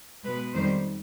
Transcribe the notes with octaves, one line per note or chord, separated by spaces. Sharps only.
B2 G#3 B4
F2 D#3 G3 C5